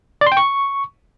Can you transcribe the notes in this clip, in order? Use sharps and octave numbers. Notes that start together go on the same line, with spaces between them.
D5
C6
G5
C#6